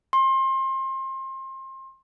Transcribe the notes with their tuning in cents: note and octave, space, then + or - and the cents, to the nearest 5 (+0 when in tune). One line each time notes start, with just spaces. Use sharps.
C6 +30